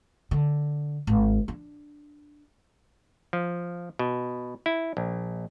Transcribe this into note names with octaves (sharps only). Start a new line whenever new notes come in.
D3
G#1
D4
F3
B2
E4
A#1